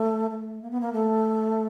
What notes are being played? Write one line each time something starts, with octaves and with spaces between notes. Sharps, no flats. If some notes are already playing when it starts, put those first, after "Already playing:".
Already playing: A3
A3
A#3
B3
A#3
A3